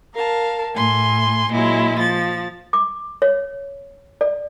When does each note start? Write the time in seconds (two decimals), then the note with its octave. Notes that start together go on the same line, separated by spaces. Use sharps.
0.14 A#4 F5 A5
0.75 A2 G#5 C6
1.52 A#2 F#3 G#3 E4
1.97 F3 A6
2.73 D6
3.22 C#5
4.21 D5